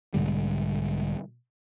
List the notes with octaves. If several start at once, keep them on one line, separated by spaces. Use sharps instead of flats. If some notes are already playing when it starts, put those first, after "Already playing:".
B1 G#2 D3 G3